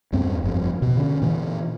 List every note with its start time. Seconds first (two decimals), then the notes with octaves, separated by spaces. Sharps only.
0.13 E2 G2 C4
0.43 G1 F2
0.82 B2
0.97 D3 C#4
1.22 A#2 E3